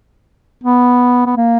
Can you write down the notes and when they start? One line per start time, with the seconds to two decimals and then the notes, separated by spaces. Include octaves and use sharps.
0.64 B3
1.26 B3
1.37 A#3